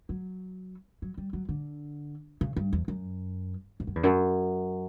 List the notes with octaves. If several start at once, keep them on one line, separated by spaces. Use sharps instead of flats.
F#3
F#3
G3
F#3
D3
C#3
G2
E2
F#2
G2
F#2
E2
F#2